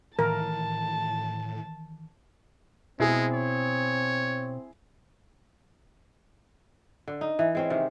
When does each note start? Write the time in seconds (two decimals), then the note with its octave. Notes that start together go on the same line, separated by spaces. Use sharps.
0.19 A2 D#3 E3 A#4 A5
3.00 B2 G#3 C4 E4 G#4
3.33 C#5
7.08 D3
7.21 D#4
7.39 E3
7.55 G#3 C4 C#4
7.70 C3 D#3 C5